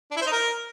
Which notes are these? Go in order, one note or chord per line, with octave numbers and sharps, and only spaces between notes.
D4
E4
C5
D#4
A#4